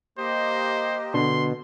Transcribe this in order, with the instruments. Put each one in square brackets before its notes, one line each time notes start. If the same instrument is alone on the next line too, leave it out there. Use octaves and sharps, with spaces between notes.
[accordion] A#3 G4 D#5 [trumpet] C5
[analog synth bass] B2 [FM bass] D3 [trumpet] C6